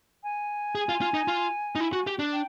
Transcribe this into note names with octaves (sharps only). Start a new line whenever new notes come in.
G#5
G#4
F4
F4
D#4
F4
D#4
E4
F#4
G4
D4
G5